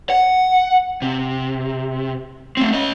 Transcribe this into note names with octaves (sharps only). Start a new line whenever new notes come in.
F#5
C3
A3 C4
C#4 D#5